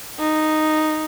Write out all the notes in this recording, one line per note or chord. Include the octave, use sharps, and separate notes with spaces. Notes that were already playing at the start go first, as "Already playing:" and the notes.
D#4